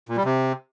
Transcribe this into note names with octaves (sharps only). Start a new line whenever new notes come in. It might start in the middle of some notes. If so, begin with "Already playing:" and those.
A#2
G3
C3